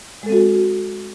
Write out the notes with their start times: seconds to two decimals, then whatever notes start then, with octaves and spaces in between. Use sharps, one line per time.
0.23 G#3
0.26 A4
0.29 C4
0.32 F#4